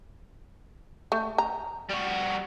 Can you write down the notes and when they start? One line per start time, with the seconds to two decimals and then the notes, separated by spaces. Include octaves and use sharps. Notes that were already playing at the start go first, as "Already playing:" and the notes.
1.12 A3
1.38 A#5
1.89 G3 F#4